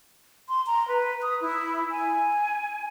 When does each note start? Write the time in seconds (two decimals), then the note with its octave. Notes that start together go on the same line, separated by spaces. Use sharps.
0.49 C6
0.67 A#5
0.88 B4
1.22 D#6
1.41 E4
1.91 G#5